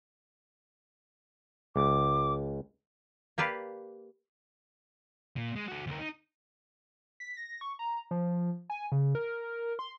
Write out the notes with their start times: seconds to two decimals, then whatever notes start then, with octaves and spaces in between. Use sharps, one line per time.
1.76 C#2 D6
3.38 A#3 G4 B4 D5 F5
5.37 A#2
5.56 G#3
5.68 F#4 A4
5.87 D2 A#4
5.99 D#4
7.20 B6
7.37 A#6
7.61 C#6
7.79 A#5
8.11 F3
8.70 G#5
8.92 C#3
9.15 A#4
9.79 C6